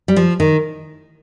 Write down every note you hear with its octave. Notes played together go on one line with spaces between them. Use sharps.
G3
F3
D#3